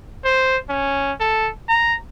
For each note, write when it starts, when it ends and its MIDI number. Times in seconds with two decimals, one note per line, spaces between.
0.25 0.58 72
0.70 1.13 61
1.20 1.50 69
1.69 1.95 82